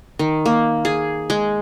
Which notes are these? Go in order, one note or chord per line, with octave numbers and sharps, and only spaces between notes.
D#3
A#3
G#4
G#3